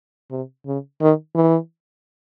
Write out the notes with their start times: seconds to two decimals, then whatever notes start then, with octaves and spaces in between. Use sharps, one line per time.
0.31 C3
0.66 C#3
1.01 D#3
1.35 E3